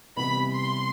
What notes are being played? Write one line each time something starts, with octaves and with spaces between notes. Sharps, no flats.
C3 E3 G3 B3 B5
C6